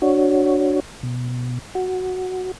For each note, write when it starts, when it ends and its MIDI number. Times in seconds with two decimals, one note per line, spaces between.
0.02 0.80 62
0.02 0.80 66
0.02 0.80 73
1.03 1.58 47
1.75 2.51 66